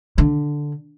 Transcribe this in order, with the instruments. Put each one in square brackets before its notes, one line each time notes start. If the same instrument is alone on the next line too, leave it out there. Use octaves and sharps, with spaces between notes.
[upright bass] D3